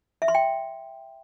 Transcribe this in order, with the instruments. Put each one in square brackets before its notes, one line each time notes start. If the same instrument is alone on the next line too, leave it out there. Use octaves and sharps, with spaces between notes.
[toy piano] E5
C6
G5